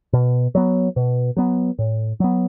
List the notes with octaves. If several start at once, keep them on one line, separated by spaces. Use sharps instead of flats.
B2
F#3 B3
B2
F#3 B3
A2
F#3 B3